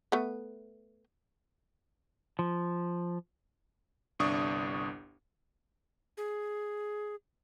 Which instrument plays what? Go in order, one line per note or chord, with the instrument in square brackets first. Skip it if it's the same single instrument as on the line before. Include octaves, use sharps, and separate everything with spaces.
[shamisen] A3 B3
[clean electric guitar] F3
[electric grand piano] G1 C2 D4 C#6 D#6
[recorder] G#4